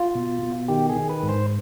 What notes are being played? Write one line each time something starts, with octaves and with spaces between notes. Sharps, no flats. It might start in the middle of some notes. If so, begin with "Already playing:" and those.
Already playing: F4
B2
B2
D#3 G4
G#4
D#3
B4
G#2
C5